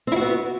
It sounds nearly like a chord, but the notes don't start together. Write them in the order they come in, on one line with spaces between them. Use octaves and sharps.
C4 E4 F#4 B3